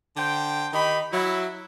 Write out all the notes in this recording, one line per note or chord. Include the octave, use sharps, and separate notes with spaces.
D3 C5 G5
D#3 D#4 G4 B5
F#3 E4